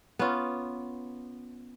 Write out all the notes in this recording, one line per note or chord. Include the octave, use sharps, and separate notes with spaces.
B3 C#4 F4